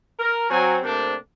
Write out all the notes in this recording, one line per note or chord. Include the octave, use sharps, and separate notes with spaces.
A#4
F#3 C4 G#5
C3 A3 A#3 C4 D4